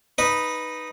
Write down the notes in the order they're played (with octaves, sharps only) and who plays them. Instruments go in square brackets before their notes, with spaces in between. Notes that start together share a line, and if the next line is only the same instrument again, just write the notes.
[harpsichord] D#4 B4